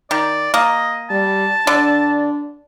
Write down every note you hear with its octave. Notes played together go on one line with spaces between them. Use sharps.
D#3 D5
A#3 D#5
G3 A5
D3 D4